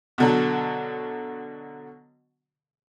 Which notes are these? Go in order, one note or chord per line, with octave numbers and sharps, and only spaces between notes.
B2 D3 F#3